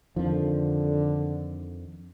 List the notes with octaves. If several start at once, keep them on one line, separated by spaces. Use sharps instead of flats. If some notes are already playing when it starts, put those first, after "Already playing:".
F2 D3 D#3 F3